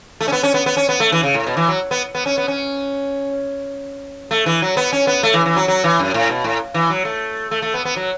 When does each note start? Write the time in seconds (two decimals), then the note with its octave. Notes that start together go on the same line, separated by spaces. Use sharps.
0.21 A3
0.28 C#4
0.32 B3
0.43 C#4
0.54 B3
0.66 B3
0.77 C#4
0.89 B3
1.00 A3
1.12 E3
1.23 C#3
1.34 A2
1.46 B2
1.57 E3
1.68 F#3
1.91 B3
2.15 B3
2.26 C#4
2.38 B3
2.48 C#4
4.31 A3
4.46 E3
4.62 F#3
4.77 B3
4.92 C#4
5.07 B3
5.23 A3
5.34 E3
5.46 E3
5.56 F#3
5.68 F#3
5.84 E3
5.99 F#2
6.14 A2
6.29 B2
6.44 A2
6.74 E3
6.90 F#3
7.05 A3
7.51 A3
7.62 A3
7.74 B3
7.85 B3
7.96 F#3